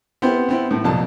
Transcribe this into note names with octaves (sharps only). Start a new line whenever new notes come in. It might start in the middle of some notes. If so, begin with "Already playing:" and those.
B3 C4 E4 G4 C5
B3 C4 E4
A2
C2 F2 A#2 A5